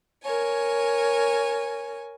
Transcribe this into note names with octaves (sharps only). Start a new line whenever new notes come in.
A#4 C#5 G#5